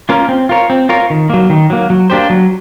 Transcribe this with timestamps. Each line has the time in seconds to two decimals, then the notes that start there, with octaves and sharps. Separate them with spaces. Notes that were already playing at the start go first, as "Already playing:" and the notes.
0.09 A#3 C#4 F4 A#4
0.29 C4
0.49 F4 A#4 C#5
0.70 C4
0.89 F4 A#4 C#5
1.10 D#3
1.30 F#3 A#3
1.50 D#3
1.70 F#3 A#3
1.90 F#3
2.10 A#3 D4 G4 C5
2.30 F#3